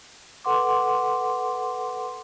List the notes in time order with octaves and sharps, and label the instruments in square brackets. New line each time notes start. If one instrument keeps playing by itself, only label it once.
[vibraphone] A4 B4 F#5 C6 D6